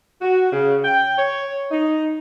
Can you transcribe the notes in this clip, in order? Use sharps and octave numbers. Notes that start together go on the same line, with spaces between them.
F#4
C#3
G5
C#5
D#4